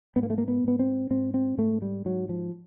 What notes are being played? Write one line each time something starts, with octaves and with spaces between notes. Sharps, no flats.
G#2 B3
A#3
A3
A#3
B3
G#2 B3
C4
G#2 C4
C4
G#2 A3
G3
G#2 F#3
F3